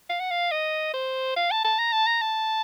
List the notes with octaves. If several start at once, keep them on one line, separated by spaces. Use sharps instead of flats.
F5
F#5
F5
D#5
C5
F5
A5
A5
A#5
A5
A#5
A5